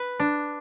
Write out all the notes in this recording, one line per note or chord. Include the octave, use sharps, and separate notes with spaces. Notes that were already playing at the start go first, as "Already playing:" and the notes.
Already playing: B4
D4